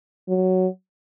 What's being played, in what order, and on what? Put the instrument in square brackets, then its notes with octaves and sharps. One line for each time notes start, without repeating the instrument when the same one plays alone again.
[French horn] F#3